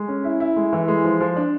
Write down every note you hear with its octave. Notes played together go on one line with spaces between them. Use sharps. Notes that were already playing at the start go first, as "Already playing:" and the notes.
Already playing: G#3
C#4
E4
E4
G#3
E3
G#3
F3
F3
D4